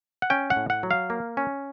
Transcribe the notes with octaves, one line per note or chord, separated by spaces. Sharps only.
F#5
C#4 G5
F#5
A2
F#5
F#3
F5
A#3
C#4